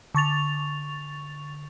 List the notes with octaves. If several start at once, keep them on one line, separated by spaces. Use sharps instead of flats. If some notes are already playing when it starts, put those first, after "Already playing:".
D3 C#6 A6 F7